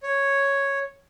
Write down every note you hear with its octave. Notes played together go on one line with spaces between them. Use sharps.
C#5